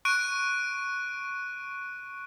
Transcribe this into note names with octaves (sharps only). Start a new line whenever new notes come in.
C#6 F#6 D7 D#7